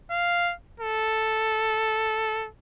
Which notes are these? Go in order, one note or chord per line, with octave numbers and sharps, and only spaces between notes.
F5
A4